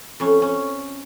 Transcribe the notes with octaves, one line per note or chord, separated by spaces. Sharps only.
F2 C#4
C#4